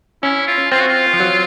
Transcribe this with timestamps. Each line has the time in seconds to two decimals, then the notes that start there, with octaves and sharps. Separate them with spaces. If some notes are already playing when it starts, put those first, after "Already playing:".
0.23 C#4 E4
0.47 F4
0.72 C4 F4
0.80 F#4
0.88 F4
1.13 F3
1.20 F#3